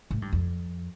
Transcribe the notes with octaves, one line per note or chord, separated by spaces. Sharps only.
A2
G2
F2